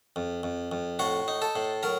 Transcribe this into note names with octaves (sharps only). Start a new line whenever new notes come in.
F2
F2
F2
A2 F#4 F#5
D#4
A4 A5
A2
F#3 A#4 A#5